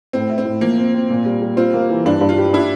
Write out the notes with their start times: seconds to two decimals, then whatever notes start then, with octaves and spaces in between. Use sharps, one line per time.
0.13 A2 C4
0.30 E4
0.38 C4
0.45 A2
0.61 F3 A#3
0.78 C4
0.94 C4
1.10 A#2
1.26 G3
1.42 G3
1.57 C4 F4
1.74 A#3
1.90 E3
2.06 G2 D4
2.21 G2
2.29 F4
2.38 G4
2.53 D4 E4